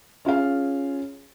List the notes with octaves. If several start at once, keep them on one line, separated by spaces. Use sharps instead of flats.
C#4 F4 G#4 F5